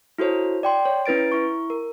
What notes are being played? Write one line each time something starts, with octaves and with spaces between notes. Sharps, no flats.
E4 F#4 A4 C5 C#5
D5 G5 C6
C#5
C#4 E4 B4 A6 D7
E4 C#6
A#4